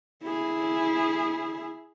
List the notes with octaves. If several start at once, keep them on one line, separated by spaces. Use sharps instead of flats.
E4 G#4